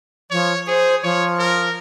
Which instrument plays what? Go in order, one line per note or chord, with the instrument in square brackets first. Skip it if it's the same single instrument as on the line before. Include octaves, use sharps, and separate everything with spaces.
[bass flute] F3 [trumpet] C#5
[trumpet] G#4 [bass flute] C5
[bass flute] F3 [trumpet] C#5
[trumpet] A#4